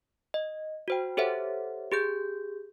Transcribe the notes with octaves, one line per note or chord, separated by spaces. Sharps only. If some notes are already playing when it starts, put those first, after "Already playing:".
D#5
F#4 C5 G5
G4 A4 C5 C#5 E5 F#5
G4 G#4 G6